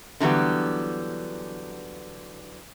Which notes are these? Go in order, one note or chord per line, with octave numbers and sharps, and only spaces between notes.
D3 E3 F#3 G3 B3